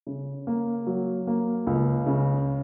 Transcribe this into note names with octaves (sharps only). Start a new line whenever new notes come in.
C#3
A#3
F#3
A#3
C#2
C#3